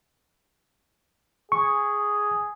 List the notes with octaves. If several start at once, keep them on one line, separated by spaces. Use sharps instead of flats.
G#4 C#6